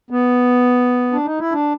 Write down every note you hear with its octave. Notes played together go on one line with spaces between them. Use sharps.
B3
D4
D#4
E4
D4